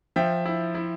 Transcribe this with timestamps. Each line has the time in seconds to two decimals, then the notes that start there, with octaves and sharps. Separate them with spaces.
0.16 F3 E5 G5
0.46 E4
0.75 E4